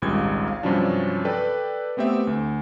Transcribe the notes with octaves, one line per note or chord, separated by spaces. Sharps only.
G#1 C#2 A#2 G3 G#6
F5
G2 C3 F3 F#3 C#4 D4
A4 B4 D5 G5
A3 B3 C4 G4 E5
D2